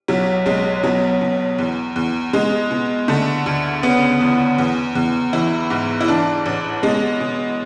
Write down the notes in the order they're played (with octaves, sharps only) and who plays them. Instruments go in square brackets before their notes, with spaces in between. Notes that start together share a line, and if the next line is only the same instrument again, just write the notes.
[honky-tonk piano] B1 F#3
B1 G#3
B2 F#3
B2
E2
E2
B2 G#3
B2
D3 A3
D2
C#3 B3
E2
E2
E2
E3 E4
G#2
E4
E3 D4
A1
B2 G#3
B2